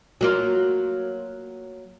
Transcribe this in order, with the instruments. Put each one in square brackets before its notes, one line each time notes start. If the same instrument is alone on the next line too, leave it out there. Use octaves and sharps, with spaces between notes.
[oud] F#3 A#3 F4